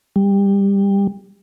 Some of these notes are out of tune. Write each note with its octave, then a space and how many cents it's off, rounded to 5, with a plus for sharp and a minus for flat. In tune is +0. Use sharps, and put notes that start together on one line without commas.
G3 +20